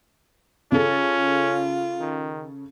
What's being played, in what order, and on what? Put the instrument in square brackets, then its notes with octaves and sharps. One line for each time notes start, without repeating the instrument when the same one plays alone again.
[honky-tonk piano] C#3 A4 [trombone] C#4 [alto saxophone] F4
[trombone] D#3